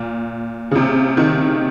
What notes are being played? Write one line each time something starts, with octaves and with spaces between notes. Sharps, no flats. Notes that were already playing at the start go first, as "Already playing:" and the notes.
Already playing: A#2
C#3
C3
D#3